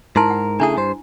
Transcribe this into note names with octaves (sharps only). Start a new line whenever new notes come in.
G#2 E4 A#4 A5 C6
F#5
C#3 A3 D4 E4 G#4
G2 C5